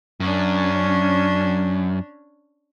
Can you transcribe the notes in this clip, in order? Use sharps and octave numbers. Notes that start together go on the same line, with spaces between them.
F#2 C#4 D4